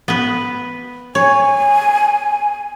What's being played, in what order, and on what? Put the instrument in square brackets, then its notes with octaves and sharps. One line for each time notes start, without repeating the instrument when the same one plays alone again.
[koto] B3 B4
[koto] C#5 [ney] G#5